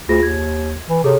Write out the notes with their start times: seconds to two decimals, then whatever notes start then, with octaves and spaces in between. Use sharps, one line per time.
0.09 D2 F4 G#4 A#6
0.23 D#2 G#6
0.89 E3
1.04 C3 G#4 A4 C#5